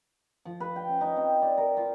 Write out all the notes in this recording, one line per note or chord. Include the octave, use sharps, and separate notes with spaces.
F3
B4
G5
C#4
D#4
C4
D5
A#4
F4